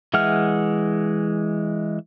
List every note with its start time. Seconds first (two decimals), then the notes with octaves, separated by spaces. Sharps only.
0.14 E3 G#3 E5 F#5 F6